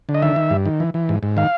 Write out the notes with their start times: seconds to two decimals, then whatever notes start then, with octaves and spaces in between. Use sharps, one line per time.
0.09 D3
0.15 D#5
0.22 D#3 E5
0.36 D#3
0.51 G2
0.66 D#3
0.80 E3
0.94 E3
1.09 G#2
1.23 G#2
1.37 D#3 F5